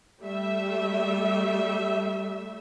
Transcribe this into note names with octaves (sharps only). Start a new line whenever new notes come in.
G3 A3 E5